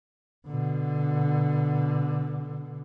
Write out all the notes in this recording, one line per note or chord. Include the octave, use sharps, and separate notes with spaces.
B2 D3